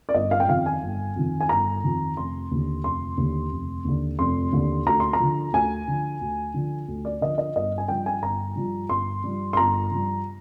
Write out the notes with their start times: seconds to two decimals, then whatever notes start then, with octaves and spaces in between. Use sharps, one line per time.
0.09 D5
0.14 G1 D#5
0.31 F5
0.40 G5
0.48 F2 D#3 F5
0.66 G#5
0.83 G1
1.16 F2 D#3
1.40 G#5
1.49 G1 A#5
1.84 F2 D#3
2.17 F1 C6
2.51 D#2 D3
2.84 F1 C6
3.17 D#2 D3
3.52 F1
3.85 D#2 D3
4.19 F1 C6
4.52 D#2 D3
4.86 D2 A#5
5.00 C6
5.13 A#5
5.20 D3 F3
5.53 D2 G#5
5.88 D3 F3
6.21 D2
6.54 D3 F3
6.88 D2
7.05 D5
7.21 D3 F3 D#5
7.38 D#5
7.56 G1 D#5
7.78 G#5
7.88 G2 F3 G5
8.06 G#5
8.23 G1 A#5
8.56 G2 F3
8.89 G1 C6
9.24 G2 F3
9.53 C6
9.57 G1 A#5
9.91 G2 F3